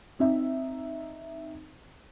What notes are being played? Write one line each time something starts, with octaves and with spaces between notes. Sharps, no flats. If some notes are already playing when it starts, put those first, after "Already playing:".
C4 D#4 E5